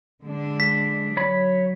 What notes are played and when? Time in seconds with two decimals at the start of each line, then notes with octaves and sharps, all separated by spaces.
0.23 D3 G#3 D4
0.60 B6
1.17 F#3 C#5 B5